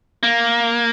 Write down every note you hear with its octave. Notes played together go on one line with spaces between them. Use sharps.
A#3